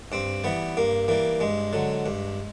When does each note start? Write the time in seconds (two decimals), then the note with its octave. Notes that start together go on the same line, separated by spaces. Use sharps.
0.12 G2 C4
0.44 E3 G3 B3
0.77 G2 A#3
1.08 E3 G3 A#3
1.40 G2 G#3
1.73 D3 F#3
2.06 G2